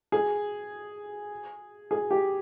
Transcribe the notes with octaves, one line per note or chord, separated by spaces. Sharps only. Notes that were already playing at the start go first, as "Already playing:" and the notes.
G#4
G#4
G4